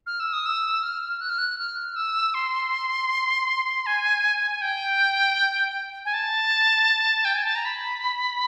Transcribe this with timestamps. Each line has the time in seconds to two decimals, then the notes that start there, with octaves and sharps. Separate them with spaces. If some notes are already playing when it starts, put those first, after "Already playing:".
0.06 F6
0.20 E6
0.33 D#6
0.46 E6
0.83 F6
1.21 F#6
1.29 F6
1.38 F#6
1.58 F6
1.96 E6
2.34 C6
3.86 G#5
4.51 G#5
4.61 G5
6.05 G#5
6.14 A5
7.25 G5
7.34 G#5
7.44 A5
7.55 A#5
7.65 B5